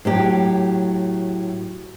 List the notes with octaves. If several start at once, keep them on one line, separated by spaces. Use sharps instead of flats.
A2 F#3 G4